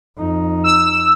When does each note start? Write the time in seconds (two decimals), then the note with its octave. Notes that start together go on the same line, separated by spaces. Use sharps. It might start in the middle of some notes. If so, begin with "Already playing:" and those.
0.16 F2 D#4
0.64 E6